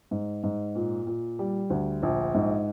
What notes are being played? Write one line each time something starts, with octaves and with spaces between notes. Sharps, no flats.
G#2
G#2
A#2
A#2
G3
D2
A#1
G#2